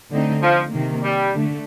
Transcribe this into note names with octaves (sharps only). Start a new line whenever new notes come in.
D3 A3 C4 D#4
F3
C3 D#3 A#3
G3
D3 A3